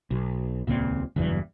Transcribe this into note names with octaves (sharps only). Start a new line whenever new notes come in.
B1
D#1 C#2 A#2 C4
F#1 E2 G2 E3